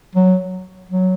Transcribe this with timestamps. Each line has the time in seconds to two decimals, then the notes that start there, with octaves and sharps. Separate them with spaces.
0.15 F#3
0.89 F#3